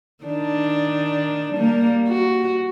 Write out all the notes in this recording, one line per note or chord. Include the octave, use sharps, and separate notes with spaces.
D#3 D4
G3 A#3
F#4